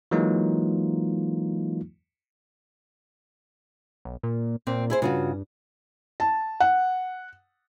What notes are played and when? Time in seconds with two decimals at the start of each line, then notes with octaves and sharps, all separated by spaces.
0.11 E3 F#3 G#3 A#3 D#4 F4
4.05 B1
4.23 A#2
4.67 A#2 C4
4.90 E4 G#4 C5
5.02 G2 C#3 F4 F#4
6.20 A5
6.60 F#5